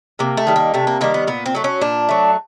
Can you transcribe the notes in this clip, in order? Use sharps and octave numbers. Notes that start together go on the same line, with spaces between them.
C3 A#3
A3
D#3 G3
A#3
C3 A3
A#3
D#3 G3 A#3
B3
A#2 B3
C4
F#3 A3
C#4
A#2 D4
F#3 A3